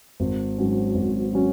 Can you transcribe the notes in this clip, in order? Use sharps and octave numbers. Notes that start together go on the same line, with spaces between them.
G#1
G#2 F#3 C#4
G#1
F#3 C#4